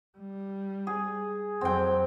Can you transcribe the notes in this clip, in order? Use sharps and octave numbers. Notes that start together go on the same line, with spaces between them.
G3
G#4
F2 F#3 C4 G5